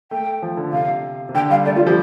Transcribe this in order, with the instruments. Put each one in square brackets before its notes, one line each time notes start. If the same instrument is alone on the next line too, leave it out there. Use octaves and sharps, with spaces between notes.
[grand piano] A3 [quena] G5
[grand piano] F3
D3
[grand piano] C3 [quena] F5
[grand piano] C3
[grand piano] D3 [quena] G5
[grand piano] G3 [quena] F5
[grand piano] A3 [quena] D5
[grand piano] G3 [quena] F4
[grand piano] F3 [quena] G4